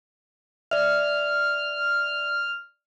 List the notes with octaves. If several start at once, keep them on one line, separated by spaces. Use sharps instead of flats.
D5 E5 F6